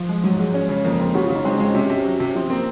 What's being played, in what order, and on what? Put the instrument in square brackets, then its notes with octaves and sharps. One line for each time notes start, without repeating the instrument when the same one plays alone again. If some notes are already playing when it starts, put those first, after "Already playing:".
Already playing: [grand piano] F3
[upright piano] G#3
[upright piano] G#2 [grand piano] F#3
[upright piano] G#2 [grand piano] G#3
[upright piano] C#4
C#3
[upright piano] F2 [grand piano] A#3
[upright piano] F2 [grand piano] C4
[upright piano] C#3 [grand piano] F#4
[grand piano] F4
[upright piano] C#3 [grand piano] D#4
[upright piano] G#3 [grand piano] C4
[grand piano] C#4
[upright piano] G#3 [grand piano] C4
[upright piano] C3 [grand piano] C#4
[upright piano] C3
F#3
C3
[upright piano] F3 [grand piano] C4
[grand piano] A#3 [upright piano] C4